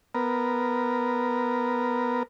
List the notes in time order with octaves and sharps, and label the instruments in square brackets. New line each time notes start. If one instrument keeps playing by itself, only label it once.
[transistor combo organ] B3 A#4